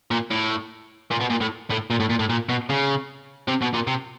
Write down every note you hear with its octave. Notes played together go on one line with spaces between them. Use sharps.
A#2
A2
A#2
B2
A#2
A2
A2
A#2
A2
A#2
A2
A#2
B2
C#3
C3
B2
A#2
C3